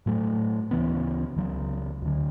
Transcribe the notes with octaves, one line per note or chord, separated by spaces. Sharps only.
A2 F#3 A3
D2 C#3 E3 B3
C#2 C#3 F#3
D2 D3 F#3